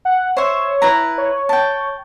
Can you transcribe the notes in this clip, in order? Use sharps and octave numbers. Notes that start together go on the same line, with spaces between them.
F#5
C5 C#5 E5
E4 B4 A#5
C#5
G5 A5